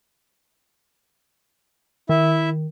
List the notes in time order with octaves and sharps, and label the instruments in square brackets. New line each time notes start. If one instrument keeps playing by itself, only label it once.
[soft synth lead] D#3 [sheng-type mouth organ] E4 E5